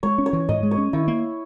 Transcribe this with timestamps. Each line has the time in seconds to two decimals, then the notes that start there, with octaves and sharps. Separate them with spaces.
0.03 G#3 C#5
0.18 C#4
0.26 C#5
0.33 E3
0.48 G#2 D#5
0.63 G#3
0.71 C#5
0.78 C#4
0.93 D#3 E4
1.08 A#3